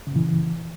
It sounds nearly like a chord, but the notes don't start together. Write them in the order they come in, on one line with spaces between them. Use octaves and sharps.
C#3 F#2 A#2 E3